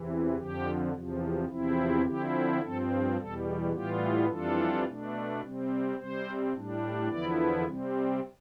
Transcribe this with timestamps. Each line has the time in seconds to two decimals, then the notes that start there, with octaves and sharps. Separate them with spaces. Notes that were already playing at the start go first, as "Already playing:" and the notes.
Already playing: E2 C3 E3
0.37 F2 D3 F3 G4
0.93 E2 C3 F3
1.49 E2 C3 F3 C4 E4
2.04 D3 F3 C4 E4 G4
2.61 G2 F3 C4 A4
3.17 E2 B2 G3 A4
3.72 A2 E3 G3 B3 F4 G4
4.28 F2 E3 G3 D4 F4 A4
4.85 B2 A3 D4
5.41 C3 G3 C4
5.97 C3 G3 C4 C5
6.52 A2 G3 D4
7.08 E2 D3 F3 B3 E4 D5
7.65 C3 G3 C4